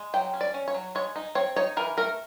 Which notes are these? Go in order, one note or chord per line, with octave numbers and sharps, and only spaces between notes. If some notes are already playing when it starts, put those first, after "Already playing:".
Already playing: G#3
F#3 G5
C#4
D5
C#4
C#5
F#3
G#3 C#5
D#4
C4 C#5
D#4 C#5
E3 A#4
A3 A#4